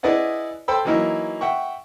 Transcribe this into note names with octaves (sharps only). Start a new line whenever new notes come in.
E4 G#4 B4 D5 D#5 F#5
A4 C5 G5 B5 E6
E3 F#3 A#3 D#4 E4
E5 F#5 G5 C#6